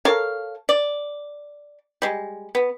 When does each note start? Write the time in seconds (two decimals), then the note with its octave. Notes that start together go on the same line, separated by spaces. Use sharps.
0.05 A4 A#4 C#5 F5
0.69 D5
2.02 G3 G#3
2.55 B3